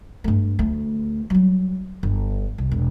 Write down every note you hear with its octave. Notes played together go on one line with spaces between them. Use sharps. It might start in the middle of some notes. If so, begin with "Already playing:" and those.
G2 A3
D2 A3
F#3 G3
G1
C2
E1